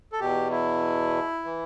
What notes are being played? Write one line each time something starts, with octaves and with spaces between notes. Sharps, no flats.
A4
E2 B2 G4
E4
E3